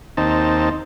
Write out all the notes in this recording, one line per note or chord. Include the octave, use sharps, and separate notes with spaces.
D#2 C4 D#4 A5